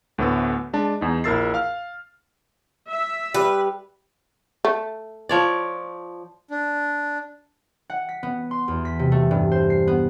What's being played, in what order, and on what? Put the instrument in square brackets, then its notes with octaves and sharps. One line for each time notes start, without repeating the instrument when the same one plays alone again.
[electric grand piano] D2 A2 A3 B3 A4 E6
G#3 D4 A5
E2 D#4
A#1 E4 A#4 E6 A6 C7
F5 F6
[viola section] E5
[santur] G3 [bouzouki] B4
[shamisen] A3
[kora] F3 C#5 D5
[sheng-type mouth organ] D4
[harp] F#5
B6
B3
C6
E2
B6
C3
A3
G2
C5
C7
B3